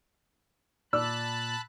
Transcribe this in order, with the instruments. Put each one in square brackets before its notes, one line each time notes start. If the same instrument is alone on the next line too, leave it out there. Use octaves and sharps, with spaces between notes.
[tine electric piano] A#2 [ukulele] D5 [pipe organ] A5 B5 F#6 [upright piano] E6